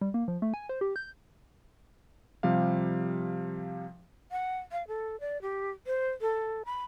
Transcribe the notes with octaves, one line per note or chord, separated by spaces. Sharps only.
G3
A#3
F3
A3
G#5
C5
G4
G6
C3 F3 G3 F5
F#5
F5
A4
D5
G4
C5
A4
B5